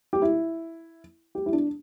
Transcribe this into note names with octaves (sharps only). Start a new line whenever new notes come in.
G4
E4
G4
E4
D4